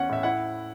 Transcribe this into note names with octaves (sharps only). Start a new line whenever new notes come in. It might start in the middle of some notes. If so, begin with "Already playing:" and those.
Already playing: E2 C#4 F#5
A2 E5
E4 F#5